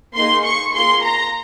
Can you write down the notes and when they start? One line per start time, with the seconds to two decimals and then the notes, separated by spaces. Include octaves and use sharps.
0.16 A#3 D#4 G#4 C6
0.45 C#6
0.74 A#3 F4 G#4 C6
1.03 A#5